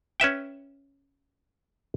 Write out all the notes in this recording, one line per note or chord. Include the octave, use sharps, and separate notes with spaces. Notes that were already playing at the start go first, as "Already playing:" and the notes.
C#4 B4 E5 G5